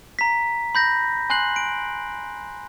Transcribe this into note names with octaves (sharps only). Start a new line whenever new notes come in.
A#5 B6
B5 G6 A#6
G#5 C6 F#6 C7 F#7
D7